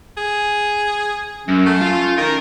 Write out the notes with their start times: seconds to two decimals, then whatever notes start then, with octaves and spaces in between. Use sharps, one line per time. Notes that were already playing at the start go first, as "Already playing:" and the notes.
0.17 G#4
1.48 F#2 C#4
1.66 A3
1.81 F4
2.18 D#3 A#4